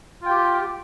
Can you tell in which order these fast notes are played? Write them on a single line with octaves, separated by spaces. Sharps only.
F4 G5 G4